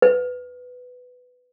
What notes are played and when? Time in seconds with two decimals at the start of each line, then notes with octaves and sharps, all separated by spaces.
0.02 B4